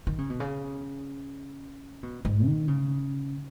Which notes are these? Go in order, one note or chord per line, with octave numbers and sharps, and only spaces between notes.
D#3
C#3
B2
C#3
B2
G#2
D#3
C#3